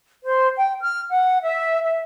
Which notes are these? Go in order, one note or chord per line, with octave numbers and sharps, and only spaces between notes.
C5
G5
F6
F#5
E5
E5